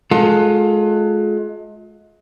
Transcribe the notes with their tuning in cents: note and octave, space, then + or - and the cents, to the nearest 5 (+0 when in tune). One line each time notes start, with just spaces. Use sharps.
G#3 +35 F4 +25 A4 +25